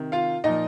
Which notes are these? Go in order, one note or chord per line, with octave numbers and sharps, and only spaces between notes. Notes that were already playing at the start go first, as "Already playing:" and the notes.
Already playing: C3 D#3
F4 F5
A#2 F3 D#4 D#5